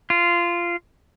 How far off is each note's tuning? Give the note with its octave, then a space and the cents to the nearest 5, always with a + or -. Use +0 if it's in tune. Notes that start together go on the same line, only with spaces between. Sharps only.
F4 -15